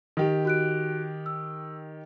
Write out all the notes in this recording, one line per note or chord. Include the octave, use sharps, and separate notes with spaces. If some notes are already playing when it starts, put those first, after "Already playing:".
D#3 G4
F#4 F#6 D7
E6